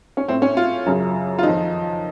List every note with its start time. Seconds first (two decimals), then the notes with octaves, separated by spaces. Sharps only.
0.17 C#4
0.28 A2 C4
0.42 C#4
0.57 F4
0.86 F#2 C#3
1.38 F4
1.43 F2 D#3 D#4